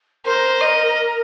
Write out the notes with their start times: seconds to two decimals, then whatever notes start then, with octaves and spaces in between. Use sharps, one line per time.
0.25 A#4 C5
0.61 D#5